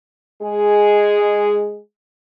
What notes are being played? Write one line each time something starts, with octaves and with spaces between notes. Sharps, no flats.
G#3 G#4